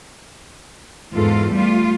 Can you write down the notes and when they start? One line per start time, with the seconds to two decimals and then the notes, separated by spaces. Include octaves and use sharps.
1.12 E2 G#2 F4 A4
1.53 G3 A3 F4